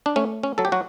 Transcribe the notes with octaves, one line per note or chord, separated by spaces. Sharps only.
D4
A3 C#4
C#4
F#3 A4
G4
F#3 F#4